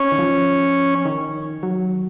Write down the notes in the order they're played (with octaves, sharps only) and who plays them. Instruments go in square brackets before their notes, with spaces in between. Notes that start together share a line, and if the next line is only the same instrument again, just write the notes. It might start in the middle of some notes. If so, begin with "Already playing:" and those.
Already playing: [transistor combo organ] C#4
[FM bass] D#3
F3
D#3
F#3